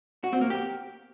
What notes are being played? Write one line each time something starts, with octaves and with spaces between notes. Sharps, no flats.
F#4
C4
A#3
G4